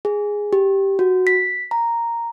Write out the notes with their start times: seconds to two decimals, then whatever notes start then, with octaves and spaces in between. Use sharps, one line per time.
0.05 G#4
0.53 G4
0.99 F#4
1.27 B6
1.71 A#5